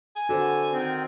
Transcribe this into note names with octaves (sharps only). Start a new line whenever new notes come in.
G#5
D3 F#4 C5
D#3 C4